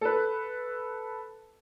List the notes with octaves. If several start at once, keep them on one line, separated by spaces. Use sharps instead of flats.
A4 B4